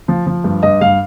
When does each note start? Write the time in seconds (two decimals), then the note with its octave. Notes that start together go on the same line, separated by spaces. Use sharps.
0.08 F3
0.27 F3
0.44 G2
0.63 G2 D#5
0.81 G2 F5